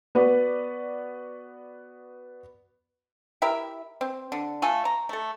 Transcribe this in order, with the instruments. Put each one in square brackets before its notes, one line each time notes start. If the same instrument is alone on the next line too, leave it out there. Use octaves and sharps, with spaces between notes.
[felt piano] B3 F#4 B4 D5
[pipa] E4 G4 A#4 E5
C4
D3
A3 F4 A4 G#5
A#5
A3 A4